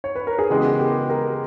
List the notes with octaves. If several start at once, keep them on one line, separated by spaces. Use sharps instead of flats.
C#5
B4
A#4
G#4
C#3 E3 G#3 B3 G4
G4 A#4
G4 A#4